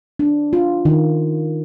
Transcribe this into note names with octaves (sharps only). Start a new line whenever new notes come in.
D4
F4
D#3